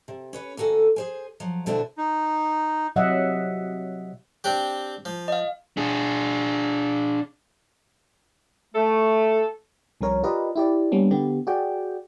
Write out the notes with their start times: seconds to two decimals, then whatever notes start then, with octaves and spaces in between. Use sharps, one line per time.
0.08 C3
0.33 C#4 B4 C#5
0.57 D2 A#3 F#4 A4 G#5
0.96 G#4 C5 G#5
1.40 F3 F#3
1.66 B2 D3 C4 D4 E4 F#4
1.98 D#4
2.96 C3 F#3 D#5 E5 F#5
4.44 C4 D4 G4
5.05 F3
5.28 D#5 F5
5.77 D4 G#4
8.75 A3 A4
10.01 C2 F3 C#4 A#4 C#5
10.24 F4 G4 A#4 B4 D5 D#5
10.56 E4 G4 D5
10.92 G3 A#3 B3 C#4 D4
11.11 D3 B3 G4
11.47 F#4 G#4 D5 G5